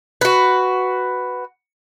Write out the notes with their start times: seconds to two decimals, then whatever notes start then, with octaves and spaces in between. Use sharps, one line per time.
0.21 F#4 B4